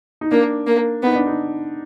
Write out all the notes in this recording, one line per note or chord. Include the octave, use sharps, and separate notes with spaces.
D#4
A#3 D4
A#3
B3 D#4
D4
D#4